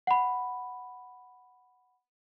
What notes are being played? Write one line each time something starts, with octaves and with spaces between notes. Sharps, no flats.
F#5 B5